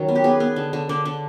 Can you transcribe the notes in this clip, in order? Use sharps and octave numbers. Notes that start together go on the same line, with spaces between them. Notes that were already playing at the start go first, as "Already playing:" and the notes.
Already playing: D#3 F#3 C#4
B3
G4
B3 G#4
B3
D3
D3
D3 D5
D3